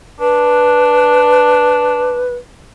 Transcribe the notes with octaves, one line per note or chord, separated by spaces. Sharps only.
D4 B4